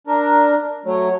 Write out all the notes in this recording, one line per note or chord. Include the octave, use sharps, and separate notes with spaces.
D4 A#4
F#3 A3 C#5